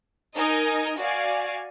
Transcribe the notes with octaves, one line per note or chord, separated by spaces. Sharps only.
D#4 A#4 D#5 G#5
F#4 D5 F5 G#5